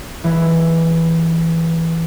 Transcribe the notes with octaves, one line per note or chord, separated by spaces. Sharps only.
E3 G#3 B4